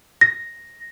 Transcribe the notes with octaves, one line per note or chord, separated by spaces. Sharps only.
A#6